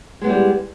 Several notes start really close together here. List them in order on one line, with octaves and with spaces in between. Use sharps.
G#3 B3 E4 G3